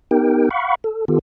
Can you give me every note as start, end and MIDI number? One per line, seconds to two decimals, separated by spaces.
0.11 0.49 59
0.11 0.49 63
0.11 0.49 67
0.11 0.49 70
0.11 0.49 79
0.51 0.75 77
0.51 0.75 78
0.51 0.75 83
0.51 0.75 85
0.84 1.05 69
1.08 1.19 51
1.08 1.19 59
1.08 1.19 65
1.08 1.19 67
1.08 1.19 69